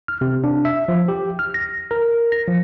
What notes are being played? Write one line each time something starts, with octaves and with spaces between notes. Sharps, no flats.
F6
C3
D4
E5
F3
G4
F6
A#6
A#4
A#6
F3